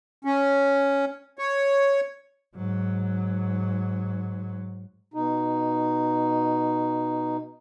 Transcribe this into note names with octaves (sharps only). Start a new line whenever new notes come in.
C#4
C#5
G#2 F#3
B2 D#4